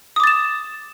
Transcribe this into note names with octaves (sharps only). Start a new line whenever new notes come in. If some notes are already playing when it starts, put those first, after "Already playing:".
D6 D#6 A6 E7